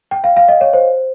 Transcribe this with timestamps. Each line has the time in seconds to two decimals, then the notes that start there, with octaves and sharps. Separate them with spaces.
0.11 G5
0.24 F5
0.36 F5
0.48 D#5
0.61 C#5
0.73 C5